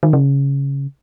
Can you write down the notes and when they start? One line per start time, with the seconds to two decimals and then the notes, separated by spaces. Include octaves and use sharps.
0.03 D#3
0.13 C#3